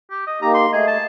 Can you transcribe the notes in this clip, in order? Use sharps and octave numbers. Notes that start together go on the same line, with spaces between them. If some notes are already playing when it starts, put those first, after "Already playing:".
G4
D#5
A#3 D#4 G4 A#5
C6
A3 G#4 D#5
A5